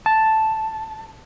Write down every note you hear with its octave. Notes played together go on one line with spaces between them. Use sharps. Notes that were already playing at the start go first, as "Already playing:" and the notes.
A5